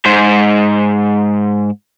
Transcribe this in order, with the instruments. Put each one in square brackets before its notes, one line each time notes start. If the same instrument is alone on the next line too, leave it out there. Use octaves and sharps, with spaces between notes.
[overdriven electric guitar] G#2 C5